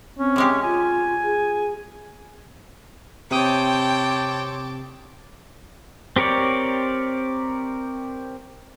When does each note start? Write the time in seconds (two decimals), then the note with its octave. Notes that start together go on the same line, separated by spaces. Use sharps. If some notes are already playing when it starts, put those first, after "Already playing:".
0.18 C4 C#4
0.36 C3 G#3 G4
0.63 F4 G#5
1.24 G#4
3.31 C3 C4 C#5 G5 A5 D6 D#6
6.16 C4 G4 A#4 C#5 D5